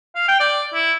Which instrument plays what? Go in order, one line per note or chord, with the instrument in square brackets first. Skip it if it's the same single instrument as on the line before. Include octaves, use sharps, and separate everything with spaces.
[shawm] F5
G5
D5
E4